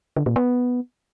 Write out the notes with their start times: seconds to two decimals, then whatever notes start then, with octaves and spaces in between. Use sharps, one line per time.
0.16 D3
0.26 A#2
0.36 B3